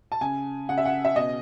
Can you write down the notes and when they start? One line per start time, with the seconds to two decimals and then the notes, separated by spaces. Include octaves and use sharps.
0.12 A5
0.21 C#3 G#5
0.69 C#3 F#5
0.78 E5
0.85 F#5
1.05 E5
1.15 B2 D#5